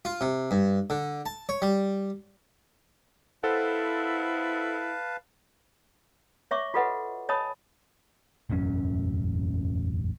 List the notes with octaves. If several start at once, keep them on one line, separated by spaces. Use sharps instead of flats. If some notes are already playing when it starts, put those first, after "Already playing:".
F4
C3
G2
D3
A5
C#5
G3
E4 A4 B4 C5 F5 F#5 A5
C#5 E5 C#6 D6
F4 F#4 A4 B4 D#5 F#5
C#5 D#5 G#5 A5 B5 D#6
E1 A1 F#2 C#4